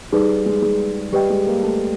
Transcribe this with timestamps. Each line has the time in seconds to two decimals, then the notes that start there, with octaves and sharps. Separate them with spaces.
0.12 G3 D#4 G#4 B4
0.46 G#3
0.62 G#3
1.12 G3 G4 B4 D#5 G5
1.30 G#3
1.47 A#3
1.63 A3